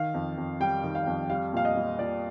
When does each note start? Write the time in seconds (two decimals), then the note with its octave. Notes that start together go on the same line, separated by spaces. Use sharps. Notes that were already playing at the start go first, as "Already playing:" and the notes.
Already playing: D#3 F5
0.14 F2
0.37 F2
0.60 G3 G5
0.84 D#3
0.95 F5
1.07 F2
1.30 G3 F5
1.53 A#2 F5
1.65 D#5
1.76 G3
1.99 A#2 D5